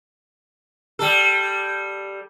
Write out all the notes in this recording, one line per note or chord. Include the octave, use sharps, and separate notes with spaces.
G3 A4